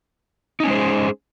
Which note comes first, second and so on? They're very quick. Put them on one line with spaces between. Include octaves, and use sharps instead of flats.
D#4 C#4 G#3 C5 G#4